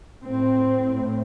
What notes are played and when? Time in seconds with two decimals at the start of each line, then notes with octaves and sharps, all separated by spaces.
0.24 A2 C4
0.82 A2